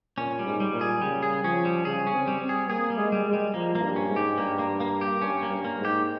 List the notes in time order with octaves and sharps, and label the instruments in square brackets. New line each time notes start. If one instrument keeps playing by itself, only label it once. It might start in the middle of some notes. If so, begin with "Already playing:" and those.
[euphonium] A#2 [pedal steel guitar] C#4
[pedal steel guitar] G3
[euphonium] G#2
[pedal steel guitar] G3
[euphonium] A#2
[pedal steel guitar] G#4
[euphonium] C#3 [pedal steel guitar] G3
[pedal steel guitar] G#4
[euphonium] F3 [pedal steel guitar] C#4
[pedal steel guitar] G3
[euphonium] C#3 [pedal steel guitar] G#4
[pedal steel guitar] C#4
[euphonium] C4
[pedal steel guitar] G3
[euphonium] C4
[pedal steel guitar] G#4
[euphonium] A#3 [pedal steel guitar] G#4
[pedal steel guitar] G3
[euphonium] G#3
[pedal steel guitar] G3
[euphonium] G#3
[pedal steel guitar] G3
[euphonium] F3 [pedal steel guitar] A#3
[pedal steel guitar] A#3
[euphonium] G2
[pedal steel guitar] C#4
[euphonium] G#2
[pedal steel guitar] G4
[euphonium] G2 [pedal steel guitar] A#3
[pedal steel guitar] A#3
A#3
G4
[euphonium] G2 [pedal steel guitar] C#4
[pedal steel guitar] A#3
[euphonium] G2
[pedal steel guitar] A#3
[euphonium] G#2
[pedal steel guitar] G4